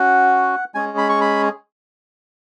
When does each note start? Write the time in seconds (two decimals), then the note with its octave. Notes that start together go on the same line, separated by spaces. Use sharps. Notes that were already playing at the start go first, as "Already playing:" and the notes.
Already playing: C#4 F#4 F#5
0.75 G#3 C#4 G#4 G#5
0.98 B5
1.09 C#6
1.21 B5